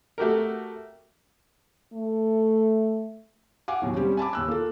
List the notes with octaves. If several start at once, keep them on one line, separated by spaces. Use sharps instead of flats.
A3 F#4 G4 A#4
A3
F5 F#5 G#5 D6
D#2 B2 F#3
G3 C4 C#4 G4
G#5 A5 B5 D6
D#2 E6 F#6
A#3 F4 A4